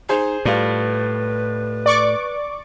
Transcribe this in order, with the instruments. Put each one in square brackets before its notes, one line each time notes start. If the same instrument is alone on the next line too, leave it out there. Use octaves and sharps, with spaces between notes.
[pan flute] D#4 [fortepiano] G#4 C5
[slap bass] A2 [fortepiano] G3 F4 [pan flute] B4
[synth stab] D5 C#6 D6